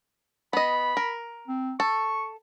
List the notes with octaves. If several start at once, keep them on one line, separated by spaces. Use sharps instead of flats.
B3 D#5 B5
A#4
C4
A4 C#6